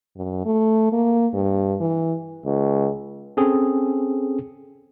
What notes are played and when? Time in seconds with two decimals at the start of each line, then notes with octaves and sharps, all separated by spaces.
0.16 F#2
0.45 A3
0.92 A#3
1.34 G2
1.80 E3
2.46 C#2
3.37 C4 C#4 G#4 A4